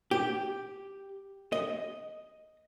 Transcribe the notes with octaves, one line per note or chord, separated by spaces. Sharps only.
G4
D#5